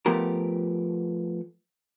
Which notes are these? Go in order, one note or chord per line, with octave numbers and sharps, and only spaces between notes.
F3 A3 B3 G4 A#4